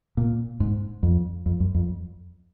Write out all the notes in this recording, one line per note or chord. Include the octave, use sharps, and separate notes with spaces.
A#2
G#2
F2
F2
F#2
F2